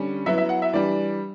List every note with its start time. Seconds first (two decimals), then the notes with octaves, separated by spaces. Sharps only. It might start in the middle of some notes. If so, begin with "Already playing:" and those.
Already playing: D3 G3 C#4
0.26 F#3 B3 E4 E5
0.38 E5
0.49 F#5
0.62 E5
0.73 E3 G3 D4 D5